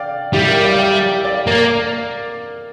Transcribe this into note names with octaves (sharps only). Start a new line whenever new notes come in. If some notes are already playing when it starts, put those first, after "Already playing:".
Already playing: D5 F5 G5
G3 E4 G4
G4 A#4
D5 F5
E5 G5
D5 F5
A#3 A#4 D5